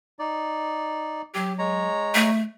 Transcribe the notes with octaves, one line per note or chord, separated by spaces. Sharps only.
D#4 D5
F#3 G4
G#3 C#5 A#5
A3